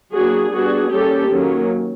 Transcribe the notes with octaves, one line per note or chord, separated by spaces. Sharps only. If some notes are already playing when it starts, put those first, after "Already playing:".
F#3 A#3 D4 F#4 G#4
G3 B3 D4 F#4 G#4
G3 A#3 C#4 G4 A4
D#3 F#3 A#3 C#4